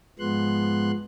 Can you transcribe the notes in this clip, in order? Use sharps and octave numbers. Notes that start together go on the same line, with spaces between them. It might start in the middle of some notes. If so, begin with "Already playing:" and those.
G#2 F3 G#3 B3 C6 F#6